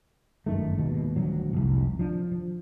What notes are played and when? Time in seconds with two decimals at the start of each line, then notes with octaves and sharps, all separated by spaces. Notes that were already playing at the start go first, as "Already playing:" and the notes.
0.46 G1 F#2 D#3 A3
0.78 D#2 G#2 B2
1.16 D#1 D2 F#3
1.53 F1 C2
1.99 F3 D4
2.32 F3